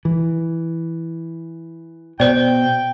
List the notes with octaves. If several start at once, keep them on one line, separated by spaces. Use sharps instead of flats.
E3
B2 C5 D5 G5